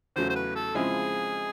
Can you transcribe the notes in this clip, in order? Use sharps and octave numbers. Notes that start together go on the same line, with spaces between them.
E2 C#3 F#3 A3 C5
C5
B4
A4
C#3 F3 G#3 C4 E4 G#4